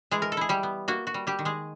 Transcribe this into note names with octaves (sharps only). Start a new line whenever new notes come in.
E3 G#3 G#4
A#4
A4
E4 G#4
G3 G4
B3
A#3 F#4
F#4
G3
G3 G4
D#3
G#3 G#4